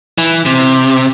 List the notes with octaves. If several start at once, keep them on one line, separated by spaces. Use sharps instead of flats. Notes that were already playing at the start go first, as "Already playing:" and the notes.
E3
C3